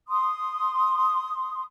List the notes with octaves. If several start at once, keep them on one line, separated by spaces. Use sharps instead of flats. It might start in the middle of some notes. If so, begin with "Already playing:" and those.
C6 D#6